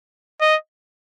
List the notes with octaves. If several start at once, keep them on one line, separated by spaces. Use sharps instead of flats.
D#5